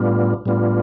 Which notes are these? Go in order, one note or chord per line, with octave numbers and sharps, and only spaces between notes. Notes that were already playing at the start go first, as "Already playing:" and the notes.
Already playing: A2 G3 B3 D4 F4
A2 G3 B3 D4 F4